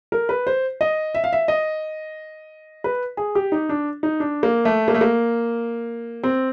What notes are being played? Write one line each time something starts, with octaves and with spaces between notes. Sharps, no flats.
A#4
B4
C5
D#5
E5
F5
E5
D#5
B4
G#4
G4
D#4
D4
D#4
D4
A#3
A3
A#3
A3
A#3
C4